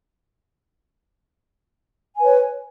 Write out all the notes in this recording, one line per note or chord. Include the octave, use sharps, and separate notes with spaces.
B4 C#5 G#5